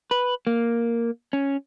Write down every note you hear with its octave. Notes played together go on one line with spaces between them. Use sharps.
B4
A#3
C#4